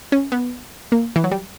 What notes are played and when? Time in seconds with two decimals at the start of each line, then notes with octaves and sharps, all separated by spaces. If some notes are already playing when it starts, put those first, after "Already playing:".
0.12 C#4
0.32 B3
0.92 A#3
1.16 E3
1.24 F#3
1.31 G3